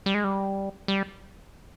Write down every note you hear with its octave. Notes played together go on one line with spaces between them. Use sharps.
G3
G#3
G3
G3